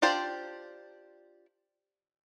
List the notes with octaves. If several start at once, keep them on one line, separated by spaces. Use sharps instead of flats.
D4 F4 G4 C5 D5